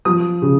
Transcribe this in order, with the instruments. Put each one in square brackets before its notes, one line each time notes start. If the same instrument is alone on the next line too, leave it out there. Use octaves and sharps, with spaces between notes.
[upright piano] F3 D#6
C#3